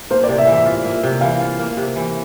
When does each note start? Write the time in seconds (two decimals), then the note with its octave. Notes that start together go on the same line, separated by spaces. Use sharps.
0.10 A#3 C5
0.24 D5
0.29 C3
0.38 E5
0.47 E3
0.53 E5
0.65 F4
0.85 A#3
1.03 C3
1.21 E3 F5
1.41 F4
1.59 A#3
1.77 C3
1.96 E3